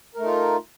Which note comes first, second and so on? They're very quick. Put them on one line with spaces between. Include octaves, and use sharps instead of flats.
A#4 A3 D#4 F4